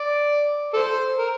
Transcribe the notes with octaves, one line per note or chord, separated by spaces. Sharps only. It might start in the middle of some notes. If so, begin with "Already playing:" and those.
Already playing: D5
A4 C5
A#4